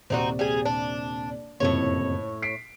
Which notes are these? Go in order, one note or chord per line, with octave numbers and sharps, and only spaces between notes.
D#1 C3 C4 D#4 F#4 D5
G3 G#4
D4
F#1 C2 F2 A2 F3 C#5
B6 C7 D7